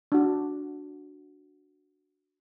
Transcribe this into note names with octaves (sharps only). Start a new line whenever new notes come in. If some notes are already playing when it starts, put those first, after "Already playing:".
D4 F#4